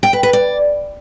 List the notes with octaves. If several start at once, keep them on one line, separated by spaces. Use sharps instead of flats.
G5
B4
B4
D5